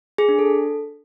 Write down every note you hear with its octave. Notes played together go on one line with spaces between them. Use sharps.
G#4
D4
A4